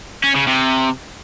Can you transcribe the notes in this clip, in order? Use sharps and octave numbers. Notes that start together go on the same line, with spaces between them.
C#4
C#3
C3